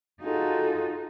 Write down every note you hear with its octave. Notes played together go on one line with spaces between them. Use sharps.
D#4 F4 F#4 G#4 A4